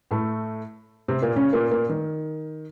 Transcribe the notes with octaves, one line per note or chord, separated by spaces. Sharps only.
A2 A3
C3 C4
A#2 A#3
C#3 C#4
A#2 A#3
A#2 A#3
D#3